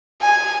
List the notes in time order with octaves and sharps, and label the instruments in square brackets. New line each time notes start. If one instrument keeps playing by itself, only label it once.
[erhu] G#5